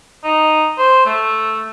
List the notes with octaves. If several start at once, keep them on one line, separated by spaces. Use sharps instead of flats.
D#4
C5
A3